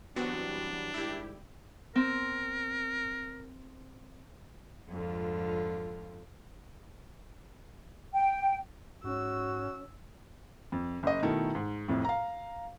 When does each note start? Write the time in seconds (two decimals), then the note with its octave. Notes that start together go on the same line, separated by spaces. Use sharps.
0.16 E3 F#3 G3 B3 C4 D4 F#4
0.94 G#2 D#3 G3 E4 G4
1.95 C4 A#4
4.89 F2 G#2 D3 F4
8.14 G5
9.04 G#2 C#4 F#4 E6
10.72 F2
11.03 F#1 D#5
11.22 B2 D#3 A3 E4 A4 A#4
11.55 G#2
11.88 C2 F2 A2
12.05 F5 A#5